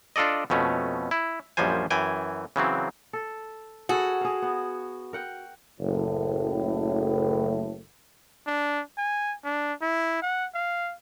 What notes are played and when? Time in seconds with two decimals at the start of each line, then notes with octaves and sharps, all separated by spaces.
0.16 D4 F4 A4 D5 D#5
0.50 F2 B2 A3 C#4
1.11 E4
1.57 A#1 F#2 F3 G3 C5 G#5
1.91 F#2 E3 G5 G#5
2.56 C#3 E3 F#3 C4
3.13 A4
3.89 F#4 G#4 A4 B4
4.21 G#4 F5
4.42 B3
5.13 A#4 F#5 G5
5.80 F#1 A2
8.47 D4
8.97 G#5
9.44 D4
9.81 E4
10.22 F#5
10.54 F5